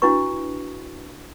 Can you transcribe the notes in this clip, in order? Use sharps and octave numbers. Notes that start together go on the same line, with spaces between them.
D4 E4 F#4 B4 C#6